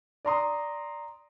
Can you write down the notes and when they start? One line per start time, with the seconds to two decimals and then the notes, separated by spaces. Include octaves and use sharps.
0.25 D5 A#5 C6 D#6